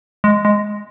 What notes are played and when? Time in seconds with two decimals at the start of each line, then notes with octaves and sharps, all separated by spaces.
0.24 G#3
0.45 G#3